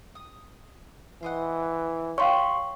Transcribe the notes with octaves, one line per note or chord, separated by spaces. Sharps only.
D#6
E3 C5 D#5 F#5
G4 C#5 D#5 F5 A5 C6 C#6